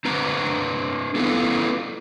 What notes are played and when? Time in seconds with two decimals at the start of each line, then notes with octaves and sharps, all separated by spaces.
0.05 C4 D4 B4 A#5
1.16 B3 E4 F4 A4 B4